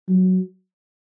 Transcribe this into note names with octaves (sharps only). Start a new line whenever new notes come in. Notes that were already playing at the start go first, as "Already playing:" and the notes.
F#3